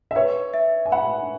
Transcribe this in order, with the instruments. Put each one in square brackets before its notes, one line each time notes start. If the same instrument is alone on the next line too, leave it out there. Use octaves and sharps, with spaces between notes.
[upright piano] E5
[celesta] B4 [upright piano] C#5
[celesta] E5
[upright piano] G#5
[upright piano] F#5 [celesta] B5